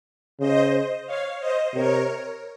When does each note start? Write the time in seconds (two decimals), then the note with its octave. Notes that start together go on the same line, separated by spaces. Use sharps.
0.39 C#3 C5 D#5
1.06 C#5 F5
1.40 C5 D#5
1.74 C3 A#4 C#5